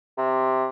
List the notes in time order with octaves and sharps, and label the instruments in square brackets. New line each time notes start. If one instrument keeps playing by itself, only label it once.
[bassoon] C3